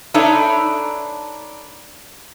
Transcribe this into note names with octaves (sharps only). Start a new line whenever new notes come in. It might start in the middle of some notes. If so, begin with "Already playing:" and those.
D4 D#4 A4 B4 C#5 E5